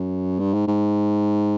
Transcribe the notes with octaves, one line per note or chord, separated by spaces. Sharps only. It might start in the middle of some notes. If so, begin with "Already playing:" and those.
Already playing: F#2
G2
G#2
G#2